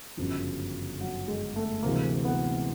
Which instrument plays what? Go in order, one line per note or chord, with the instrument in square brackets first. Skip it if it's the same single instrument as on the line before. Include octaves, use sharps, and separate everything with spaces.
[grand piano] G1 F#2 C#3 [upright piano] F3
[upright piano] F#3
G#3
A3
[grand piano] D2 C3 E3 G#3 [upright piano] A#3
[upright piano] B3